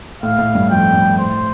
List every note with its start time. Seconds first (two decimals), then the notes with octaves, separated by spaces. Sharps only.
0.23 A2 F5
0.39 A2
0.55 G2
0.70 F2 G5
0.94 G2
1.18 A2 C5